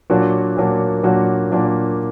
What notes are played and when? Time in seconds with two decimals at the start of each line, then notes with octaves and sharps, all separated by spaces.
0.10 A#2 F#3 A#3 D4 F#4
0.57 A#2 F#3 A#3 D4 F#4
1.03 A#2 F#3 A#3 D4 F#4
1.51 A#2 F#3 A#3 D4 F#4